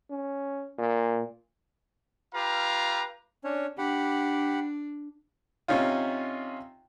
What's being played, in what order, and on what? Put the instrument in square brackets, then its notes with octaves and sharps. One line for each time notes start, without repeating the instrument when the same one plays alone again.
[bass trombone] C#4
A#2
[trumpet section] F4 G4 B4 F5 A#5
[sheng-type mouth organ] C#4 D4 C#5
[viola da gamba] D4 [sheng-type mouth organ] G4 F#5 B5
[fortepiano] C3 C#4 D#4 F4